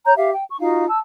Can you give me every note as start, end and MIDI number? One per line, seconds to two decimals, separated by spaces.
0.05 0.14 73
0.05 0.14 82
0.05 0.14 91
0.17 0.32 67
0.17 0.32 76
0.17 0.32 77
0.33 0.43 79
0.49 0.56 85
0.60 0.86 63
0.60 0.86 65
0.60 0.86 66
0.60 0.86 77
0.88 0.99 81
0.88 0.99 88